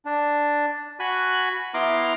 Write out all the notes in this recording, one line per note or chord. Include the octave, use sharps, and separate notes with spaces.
D4
F#4 G#5 B5 F#6
B3 E4 A#5 C6 D6 F6